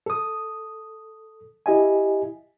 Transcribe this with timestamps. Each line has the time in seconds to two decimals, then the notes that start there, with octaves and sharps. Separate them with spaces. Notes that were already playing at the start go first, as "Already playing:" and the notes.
0.06 A4 D#6
1.66 E4 G4 D#5 E5 G#5